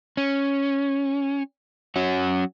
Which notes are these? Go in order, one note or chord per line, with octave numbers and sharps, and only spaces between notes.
C#4
F#3 C#4 F#4